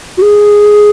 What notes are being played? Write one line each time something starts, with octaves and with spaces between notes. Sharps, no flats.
F#4
G#4